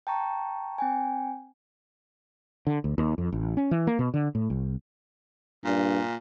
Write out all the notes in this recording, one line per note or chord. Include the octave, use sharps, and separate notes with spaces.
G5 A5 A#5 C#6
C4 G5 G#5
D3
D2
D#2
F2
A1
C#4
E3
A#3
B2
D3
A2
C2
G2 A#2